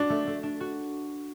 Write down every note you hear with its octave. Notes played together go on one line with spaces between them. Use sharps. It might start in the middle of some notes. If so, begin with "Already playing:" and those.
Already playing: D4 F#4
A3
A3
D4
F#4